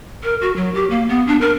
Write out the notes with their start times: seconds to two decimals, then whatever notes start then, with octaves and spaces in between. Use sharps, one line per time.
0.23 A#4
0.42 F#4
0.56 F#3
0.75 G4
0.90 A#3
1.09 B3
1.27 D4
1.41 A#4